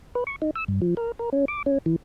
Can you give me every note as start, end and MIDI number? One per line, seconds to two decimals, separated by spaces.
0.15 0.24 71
0.27 0.36 85
0.42 0.50 63
0.55 0.64 88
0.68 0.80 43
0.82 0.95 53
0.97 1.12 70
1.19 1.30 70
1.33 1.45 61
1.48 1.62 86
1.66 1.78 61
1.86 1.96 52